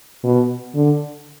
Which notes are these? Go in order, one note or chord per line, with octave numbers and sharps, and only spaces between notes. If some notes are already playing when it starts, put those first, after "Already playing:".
B2
D3